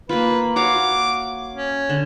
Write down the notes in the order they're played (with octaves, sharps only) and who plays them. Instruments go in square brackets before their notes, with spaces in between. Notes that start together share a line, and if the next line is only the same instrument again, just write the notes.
[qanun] A#3 F4 [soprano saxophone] B4
[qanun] F#4 C#5 F5 [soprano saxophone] D6
[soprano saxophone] C#4
[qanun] D3